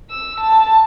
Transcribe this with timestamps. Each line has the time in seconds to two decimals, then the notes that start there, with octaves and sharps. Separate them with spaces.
0.11 E6
0.40 A5